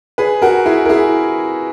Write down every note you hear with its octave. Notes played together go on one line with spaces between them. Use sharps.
G#4 B4
F#4 A#4
E4 G#4
A#4
E4 G#4